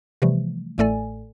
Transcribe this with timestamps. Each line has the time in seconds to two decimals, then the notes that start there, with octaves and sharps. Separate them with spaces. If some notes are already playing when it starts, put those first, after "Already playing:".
0.22 C3 E3 F3 G3 A3
0.78 A1 A2 A3 A4 D5 G#5